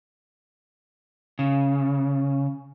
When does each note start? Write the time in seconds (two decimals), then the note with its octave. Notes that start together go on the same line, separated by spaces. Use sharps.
1.39 C#3